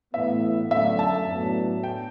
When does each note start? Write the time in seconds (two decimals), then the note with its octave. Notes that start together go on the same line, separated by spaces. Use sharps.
0.14 A2 E3 B3 E5
0.71 F#2 D3 A3 E5
0.99 A5
1.26 A2 F#3 B3 D4
1.83 G5